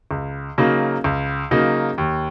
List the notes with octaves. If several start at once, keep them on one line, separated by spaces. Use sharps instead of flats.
C#2
C#3 F#3 A#3 D#4
C#2
C#3 F#3 A#3 D#4
D#2